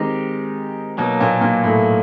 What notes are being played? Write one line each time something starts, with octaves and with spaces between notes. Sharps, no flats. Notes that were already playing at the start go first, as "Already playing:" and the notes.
Already playing: D#3 G#3 C4 D#4 G4
B2 F#3 A#3 D#4
A#2
A#2
A2